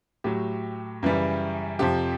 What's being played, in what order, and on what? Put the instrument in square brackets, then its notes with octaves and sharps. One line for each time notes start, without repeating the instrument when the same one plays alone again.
[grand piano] A2 F#3 G4
F#2 C#3 E3 G3
F2 C3 F3 G4